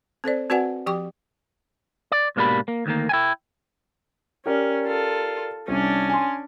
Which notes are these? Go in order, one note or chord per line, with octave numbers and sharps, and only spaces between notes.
C4 A4 C5 D5
C4 F#4 B4 D5 F#5 G#5
F3 G4 G5 C#6 D6
D5
G#2 B2 A#3 D4 G4 B5
A#3
D2 D#3 A#3
E4 G5 G#5
C#4 G4 A#4 D5
F4 A4
C2 C#4 D4
G#5 C6